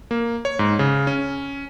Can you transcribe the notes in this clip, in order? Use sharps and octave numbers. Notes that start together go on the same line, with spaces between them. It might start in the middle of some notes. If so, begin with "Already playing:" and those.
A#3
C#5
G#2
C#3
C#4